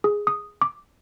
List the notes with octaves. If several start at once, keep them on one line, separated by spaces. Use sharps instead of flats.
G#4
D#6
D6